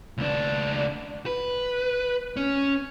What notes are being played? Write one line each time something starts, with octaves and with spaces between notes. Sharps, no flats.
C#2 D4
B4
C#4